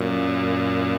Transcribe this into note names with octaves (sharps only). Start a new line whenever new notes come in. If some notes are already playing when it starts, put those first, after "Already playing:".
Already playing: F#2 A#2